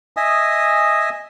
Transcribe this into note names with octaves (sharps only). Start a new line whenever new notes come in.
D#5 E5 G#5 D#6